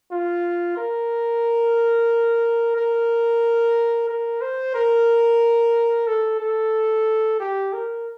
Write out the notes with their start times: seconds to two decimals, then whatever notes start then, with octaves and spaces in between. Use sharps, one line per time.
0.11 F4
0.77 A#4
2.76 A#4
4.09 A#4
4.41 C5
4.75 A#4
6.07 A4
6.40 A4
7.40 G4
7.73 A#4